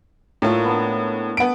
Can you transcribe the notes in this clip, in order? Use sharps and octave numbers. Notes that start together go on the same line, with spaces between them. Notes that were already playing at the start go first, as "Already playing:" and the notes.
A2 A3 A#3 D4 F4
B3 D4
B3 D4 G#5 D7